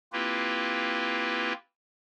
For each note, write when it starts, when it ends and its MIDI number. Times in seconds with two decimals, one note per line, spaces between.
0.13 1.53 58
0.13 1.53 60
0.13 1.53 64
0.13 1.53 65
0.13 1.53 67
0.13 1.53 71